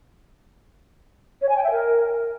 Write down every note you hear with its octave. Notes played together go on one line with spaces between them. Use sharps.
C#5
G#5
G5
E5
A#4